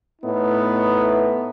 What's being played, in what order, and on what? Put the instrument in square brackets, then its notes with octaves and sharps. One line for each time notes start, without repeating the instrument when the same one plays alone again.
[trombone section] A2 B3 D#4 E4